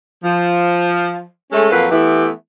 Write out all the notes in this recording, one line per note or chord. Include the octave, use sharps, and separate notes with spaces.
F3
G#3 A3 C#4 A4
F2 F#3 A#3 B4 F5
E3 A3 B3 E4 G4